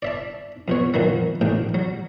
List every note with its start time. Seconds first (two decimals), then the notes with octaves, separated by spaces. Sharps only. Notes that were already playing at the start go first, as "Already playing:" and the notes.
0.02 D5 E5 A5
0.68 F2 B2 C#5
0.94 F#2 A#2 D#3 F3 F#3
1.41 A1 D2 A2 G5
1.74 F#3